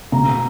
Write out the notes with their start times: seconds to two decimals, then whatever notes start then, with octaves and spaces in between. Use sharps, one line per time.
0.12 B2 A#5